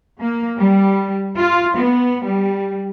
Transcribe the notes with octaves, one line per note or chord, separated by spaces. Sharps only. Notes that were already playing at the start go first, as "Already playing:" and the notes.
A#3
G3
F4
B3
G3